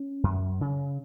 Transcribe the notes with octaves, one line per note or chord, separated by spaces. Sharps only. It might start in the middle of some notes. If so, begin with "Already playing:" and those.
Already playing: C#4
F#2
C#3